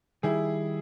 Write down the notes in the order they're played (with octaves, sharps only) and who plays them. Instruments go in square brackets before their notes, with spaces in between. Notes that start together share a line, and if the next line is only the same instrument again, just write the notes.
[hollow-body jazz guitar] D#3 G3 [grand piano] E4 G#4